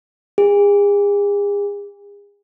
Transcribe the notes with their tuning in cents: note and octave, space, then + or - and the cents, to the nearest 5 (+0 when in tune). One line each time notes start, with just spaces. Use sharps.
G#4 -40